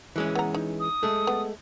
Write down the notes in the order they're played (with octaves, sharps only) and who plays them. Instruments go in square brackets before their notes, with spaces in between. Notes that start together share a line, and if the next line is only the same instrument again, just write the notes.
[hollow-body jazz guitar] E3 G#3 C#4
[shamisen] B3 A#5
D#4
[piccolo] D#6
[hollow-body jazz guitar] G#3 A3
[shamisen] B3